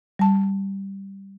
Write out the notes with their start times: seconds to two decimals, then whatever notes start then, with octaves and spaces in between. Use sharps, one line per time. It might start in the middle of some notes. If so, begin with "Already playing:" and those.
0.19 G3 A5